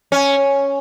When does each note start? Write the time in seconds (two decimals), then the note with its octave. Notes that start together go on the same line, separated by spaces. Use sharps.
0.12 C#4